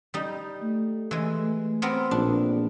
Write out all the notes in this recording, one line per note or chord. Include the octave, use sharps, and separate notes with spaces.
G3 D#4
A3
E3 G#3
B3 C4 A#4
A#1 D4